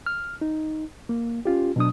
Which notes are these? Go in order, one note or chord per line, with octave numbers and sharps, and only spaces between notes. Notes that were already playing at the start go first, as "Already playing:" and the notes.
F6
D#4
A#3
C#4 F4 G4
B2 F#3 D4 D#6